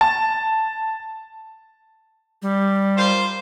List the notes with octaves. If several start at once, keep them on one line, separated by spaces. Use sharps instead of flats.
A5
G3
F4 A#4 C5